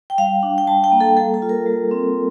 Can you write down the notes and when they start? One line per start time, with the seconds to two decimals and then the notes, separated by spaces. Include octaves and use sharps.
0.10 G5
0.18 G3 F5
0.43 D4
0.58 G5
0.67 G3 A5
0.84 G5
0.92 A#3
1.01 A4
1.17 G3 A4
1.34 A4
1.42 F4
1.49 A#4
1.66 G3
1.91 C4